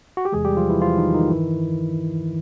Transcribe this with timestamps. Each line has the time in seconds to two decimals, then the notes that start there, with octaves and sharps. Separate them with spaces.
0.17 F#4
0.25 G4
0.32 E2 C3 E3 G#3 G#4
0.45 G3 G4
0.57 F3 F4
0.69 E3 E4
0.82 F3 F4
0.98 D#3 D#4
1.14 D#3 D#4
1.30 G2 D#3 E3 E4